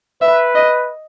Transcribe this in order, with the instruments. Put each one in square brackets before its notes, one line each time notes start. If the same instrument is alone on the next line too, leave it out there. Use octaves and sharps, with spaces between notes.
[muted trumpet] B4 [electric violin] E5
[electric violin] D#5